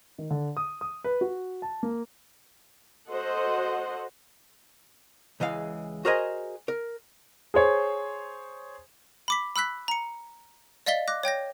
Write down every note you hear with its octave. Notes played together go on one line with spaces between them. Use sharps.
D#3
D3
D#6
D#6
B4
F#4
A5
A#3
F#4 A4 C5 D#5 F#5
C#2 E3 G#3 F5
F#4 G#4 A#4 C5 D#5 G#5
A#4
G#4 C5 C#5
B5 D6 B6
B5 E6 F#6 B6
A#5 C#7
D5 D#5 F5 A6 B6 G7
D6 F#6 A#6
C#5 G5 G6 A#6